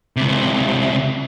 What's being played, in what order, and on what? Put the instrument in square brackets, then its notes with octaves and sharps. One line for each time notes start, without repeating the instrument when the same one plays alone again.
[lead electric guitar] C#2 C3